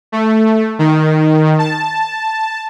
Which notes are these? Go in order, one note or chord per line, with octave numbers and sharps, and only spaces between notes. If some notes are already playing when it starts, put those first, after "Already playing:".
A3
D#3
A5